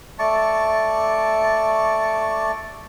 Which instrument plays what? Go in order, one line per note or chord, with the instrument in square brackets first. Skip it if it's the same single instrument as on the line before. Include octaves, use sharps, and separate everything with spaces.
[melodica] A3 D5 A5 C#6